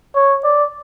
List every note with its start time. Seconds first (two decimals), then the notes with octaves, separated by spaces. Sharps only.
0.15 C#5
0.44 D5